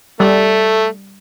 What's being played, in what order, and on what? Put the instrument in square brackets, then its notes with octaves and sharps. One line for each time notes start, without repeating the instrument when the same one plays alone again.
[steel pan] G3 [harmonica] A3